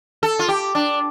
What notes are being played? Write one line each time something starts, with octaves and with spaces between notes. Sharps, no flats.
A4
F4
G4
D4